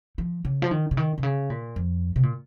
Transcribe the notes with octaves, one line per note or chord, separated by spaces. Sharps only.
F3
C#3
F3
D#3
C#3
D#3
C3
C#3
A#2
F2
C3
A#2